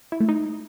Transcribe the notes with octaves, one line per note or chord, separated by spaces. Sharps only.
E4
A3
D#4